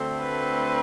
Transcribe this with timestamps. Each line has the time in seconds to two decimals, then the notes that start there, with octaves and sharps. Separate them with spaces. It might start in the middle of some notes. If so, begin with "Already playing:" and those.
Already playing: D2 D3 A3 C4
0.21 B4